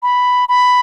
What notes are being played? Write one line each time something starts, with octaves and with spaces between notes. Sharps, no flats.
B5
B5